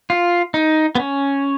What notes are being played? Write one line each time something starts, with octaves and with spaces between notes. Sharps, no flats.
F4
D#4
B3
C#4